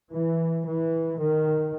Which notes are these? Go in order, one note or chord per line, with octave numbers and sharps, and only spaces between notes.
E3
E3
D#3